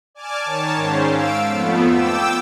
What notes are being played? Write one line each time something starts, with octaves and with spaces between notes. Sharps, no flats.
D5 G#5 A5 D6 F6
D#3 C#5 A5
G#2 C#4 C5
F5 E6 D7
F2 F3 A3 B3
G5 D6 E6